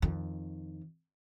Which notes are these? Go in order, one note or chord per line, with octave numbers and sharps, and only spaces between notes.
F2 D#3